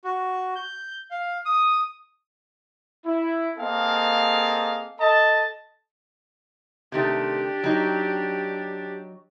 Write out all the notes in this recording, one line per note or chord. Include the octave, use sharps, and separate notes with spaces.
F#4
G6
F5
D#6
E4
A#3 C4 G#4 A4 D#5 F5
A4 D#5 A5
C3 D#3 A3 D4 G4
F#3 D#4